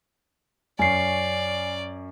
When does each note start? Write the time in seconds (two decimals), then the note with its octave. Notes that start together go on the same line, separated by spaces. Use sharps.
0.79 F#2 C#4 D5 G#5 C7